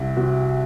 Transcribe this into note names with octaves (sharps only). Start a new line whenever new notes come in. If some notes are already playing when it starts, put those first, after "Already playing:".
Already playing: C2 E4
C3 F#4